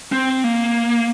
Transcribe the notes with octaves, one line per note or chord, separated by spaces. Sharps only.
C4
A#3